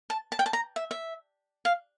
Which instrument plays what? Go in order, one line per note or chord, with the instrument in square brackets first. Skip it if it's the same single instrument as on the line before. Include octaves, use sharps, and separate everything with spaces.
[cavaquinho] A5
A5
G5
A5
A#5
E5
E5
F5